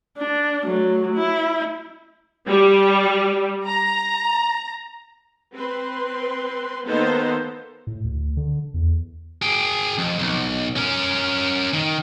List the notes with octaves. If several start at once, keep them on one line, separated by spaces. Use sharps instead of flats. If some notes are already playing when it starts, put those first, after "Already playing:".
D4
F#3 A3
E4
G3
A#5
C4 B4 C6
D#3 A#3 B3 D#4 A4 C5
A2
D2
D3
E2
G#4 G5
F2
B1
C#4 A#4
D#3